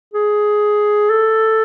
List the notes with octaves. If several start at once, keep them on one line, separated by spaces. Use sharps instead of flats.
G#4
A4